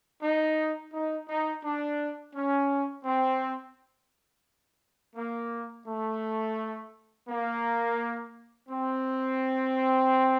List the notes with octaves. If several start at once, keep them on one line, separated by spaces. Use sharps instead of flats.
D#4
D#4
D#4
D4
C#4
C4
A#3
A3
A#3
C4